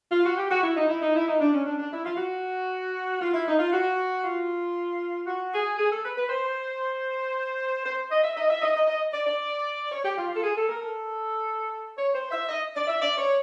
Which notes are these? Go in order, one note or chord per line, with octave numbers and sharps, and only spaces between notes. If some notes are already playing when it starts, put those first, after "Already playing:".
F4
F#4
G4
F#4
E4
D#4
E4
D#4
E4
D#4
D4
C#4
D4
D4
E4
F4
F#4
F4
E4
D#4
F4
F#4
F4
F#4
G#4
G#4
A4
B4
B4
C5
C5
D#5
E5
D#5
E5
D#5
D#5
D#5
D5
D5
C#5
G4
F4
F4
A4
G#4
A4
A#4
A4
C#5
C5
E5
D#5
D5
E5
D5
C#5